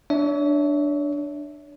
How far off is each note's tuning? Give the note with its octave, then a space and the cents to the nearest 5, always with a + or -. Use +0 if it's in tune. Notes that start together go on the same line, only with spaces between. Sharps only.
D4 +0 C#5 +35 E5 -15